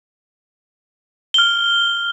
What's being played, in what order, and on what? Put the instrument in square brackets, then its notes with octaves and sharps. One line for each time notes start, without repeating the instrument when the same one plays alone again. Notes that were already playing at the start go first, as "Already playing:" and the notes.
[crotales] F6 G7